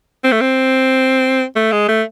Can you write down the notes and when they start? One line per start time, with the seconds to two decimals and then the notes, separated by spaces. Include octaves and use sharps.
0.24 C4
0.32 A3
0.41 C4
1.56 A3
1.72 G#3
1.88 A3